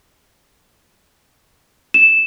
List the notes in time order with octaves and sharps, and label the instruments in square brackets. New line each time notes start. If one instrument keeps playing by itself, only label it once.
[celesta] E7